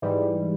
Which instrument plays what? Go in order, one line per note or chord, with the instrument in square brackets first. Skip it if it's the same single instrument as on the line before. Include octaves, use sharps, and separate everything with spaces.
[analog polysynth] G#2 E3 G3